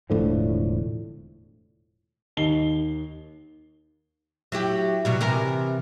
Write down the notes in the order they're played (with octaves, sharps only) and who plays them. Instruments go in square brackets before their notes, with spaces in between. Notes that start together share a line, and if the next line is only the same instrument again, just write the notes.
[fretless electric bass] E1 A2 D3 F3
[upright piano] D#2 D#5 C7 G7
[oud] F#3 E4 G4
B2 F#3 G3
C3 E3 A#4